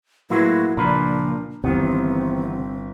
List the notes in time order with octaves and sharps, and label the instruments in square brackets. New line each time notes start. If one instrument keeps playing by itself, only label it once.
[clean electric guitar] A2 F#3 G#3 [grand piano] A#3 F#4 B4 [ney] E4
[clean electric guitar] C#2 F3 B4 [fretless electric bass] A#2 [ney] D4 [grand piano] A#5
[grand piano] G1 [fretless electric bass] C3 E3 [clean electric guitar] D#3 B3 [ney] C4